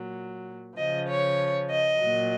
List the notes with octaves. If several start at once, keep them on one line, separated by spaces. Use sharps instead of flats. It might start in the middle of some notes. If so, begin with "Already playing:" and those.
Already playing: A#2 F#3
C#3 F3 D#5
C#5
D#5
A#2 F#3